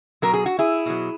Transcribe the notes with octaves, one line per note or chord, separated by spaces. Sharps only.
B2 F#3 A#4
G#4
F#4
E4 G#4
B2 F#3